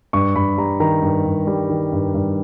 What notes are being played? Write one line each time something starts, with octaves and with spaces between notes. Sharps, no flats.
G2 C#6
G2 B5
G3 A#5
D#3 A#5
G2
G2
G3
D#3
G2
G2